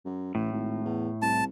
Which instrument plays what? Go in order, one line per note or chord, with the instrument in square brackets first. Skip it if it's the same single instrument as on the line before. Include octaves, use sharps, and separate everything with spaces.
[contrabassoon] F#2
[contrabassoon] A1 [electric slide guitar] A2
[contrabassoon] G#1
E2
[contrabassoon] C2 [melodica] A5